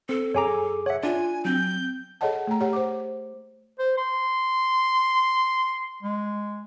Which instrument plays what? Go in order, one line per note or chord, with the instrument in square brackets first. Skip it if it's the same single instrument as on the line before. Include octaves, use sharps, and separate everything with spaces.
[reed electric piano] C4 [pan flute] A4
[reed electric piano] F#2 G#4 D6 [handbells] C#5 G#5 A#5
[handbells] C#5 E5 [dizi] F#5
[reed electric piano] D4 [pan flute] F4 [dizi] G#5
[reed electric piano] F#3 [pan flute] C4 [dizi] G6
[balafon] G#4 A4 C#5 D#5 F#5 A5
A3 A#5
G4 C#5 F#5
C5 D6
[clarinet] C5
C6
G#3